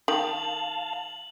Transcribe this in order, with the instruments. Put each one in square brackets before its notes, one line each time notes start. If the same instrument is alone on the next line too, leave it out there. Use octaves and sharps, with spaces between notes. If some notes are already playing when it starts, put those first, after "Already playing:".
[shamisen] D#3 [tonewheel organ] F5 A5 [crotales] F#7